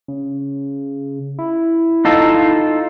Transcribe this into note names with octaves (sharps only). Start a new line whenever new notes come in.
C#3
E4
D#4 F4 A4